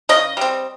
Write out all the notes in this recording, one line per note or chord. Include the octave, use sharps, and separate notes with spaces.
C#3 D#5
G3 C4